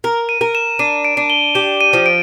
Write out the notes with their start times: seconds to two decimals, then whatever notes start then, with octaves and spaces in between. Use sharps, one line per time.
0.04 A#4
0.29 D#7
0.41 A#4
0.55 E7
0.79 D4 D#7
1.05 D7
1.17 D4
1.30 G7
1.55 G4 E7
1.81 D#7
1.93 F3
2.06 D7